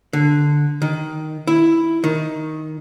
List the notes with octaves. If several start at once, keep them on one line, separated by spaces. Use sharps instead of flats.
D3
D#3
E4
D#3